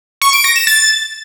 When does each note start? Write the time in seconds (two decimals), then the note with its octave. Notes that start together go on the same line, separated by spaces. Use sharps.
0.22 C#6
0.33 D7
0.44 A#6
0.56 E7
0.67 A6